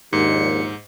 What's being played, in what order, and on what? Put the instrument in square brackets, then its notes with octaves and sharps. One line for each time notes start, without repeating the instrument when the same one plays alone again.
[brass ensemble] A#1 D#2 [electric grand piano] G#2 [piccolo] C#7